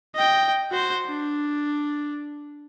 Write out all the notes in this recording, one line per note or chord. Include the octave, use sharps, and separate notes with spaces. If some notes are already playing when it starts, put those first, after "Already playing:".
D#5 G5
F#4 C5
D4